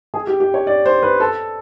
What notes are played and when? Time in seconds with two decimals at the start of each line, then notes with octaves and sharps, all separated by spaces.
0.14 G#4
0.27 G4
0.40 G4
0.54 C#5
0.67 D5
0.86 C5
1.03 B4
1.20 A4